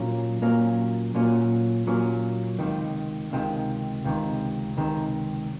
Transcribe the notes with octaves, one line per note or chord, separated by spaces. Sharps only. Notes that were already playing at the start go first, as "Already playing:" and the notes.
Already playing: A#2 F#3 A#3 C#4
A#2 F#3 A#3 C#4
A#2 F#3 A#3 C#4
A#2 F#3 A#3 C#4
C#2 C3 D#3
C#2 C3 D#3
C#2 C3 D#3
C#2 C3 D#3